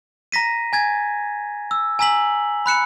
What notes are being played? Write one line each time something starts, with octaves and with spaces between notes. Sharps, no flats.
A#5 A#6 B6 D#7
G#5 G#6 A6
E6
G#5 A#5 E6 B6 F#7
B5 F#6 C#7 E7